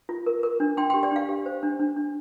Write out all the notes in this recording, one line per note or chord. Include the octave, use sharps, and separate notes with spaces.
F4
A#4
A#4
D4
D4 G5 C6
G4 G5 C6
D5 G5
D4 F5
G4
C5
D4
D4
D4